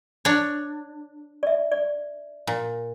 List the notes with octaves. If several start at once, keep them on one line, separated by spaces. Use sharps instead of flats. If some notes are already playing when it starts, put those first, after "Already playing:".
D4 C#5
D5 E5
D5
A#2